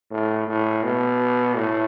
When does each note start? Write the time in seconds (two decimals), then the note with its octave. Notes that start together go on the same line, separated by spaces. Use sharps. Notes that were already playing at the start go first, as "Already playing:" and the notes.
0.11 A2
0.48 A2
0.83 B2
1.56 A2